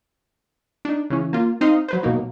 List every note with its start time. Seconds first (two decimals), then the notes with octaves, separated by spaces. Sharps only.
0.85 D4 D#4
1.10 C#3 E3 C#4
1.33 A#3 F4
1.61 C4 D#4 C5 D#5 F5
1.88 F#3 B4 C5
2.03 B2 F#3 A#3 D#4